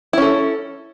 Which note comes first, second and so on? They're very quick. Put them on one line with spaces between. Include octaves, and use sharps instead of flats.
E4 C#4 A4